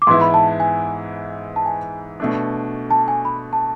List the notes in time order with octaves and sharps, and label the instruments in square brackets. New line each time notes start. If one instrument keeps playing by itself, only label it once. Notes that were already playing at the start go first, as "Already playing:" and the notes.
[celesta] D6
[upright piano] G#2 E3 B3 E4 [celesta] C6
[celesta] B5
A5
G#5
A5
G#5
[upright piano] B2 A3 D4
[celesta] A5
G#5
B5
A5